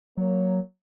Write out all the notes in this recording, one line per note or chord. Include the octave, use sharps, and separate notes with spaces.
F#3 A#3 C#5